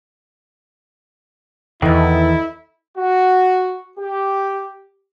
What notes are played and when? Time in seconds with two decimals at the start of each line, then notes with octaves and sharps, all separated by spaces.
1.82 E2 D#3 E3 E4 A4 D#5
2.98 F#4
3.98 G4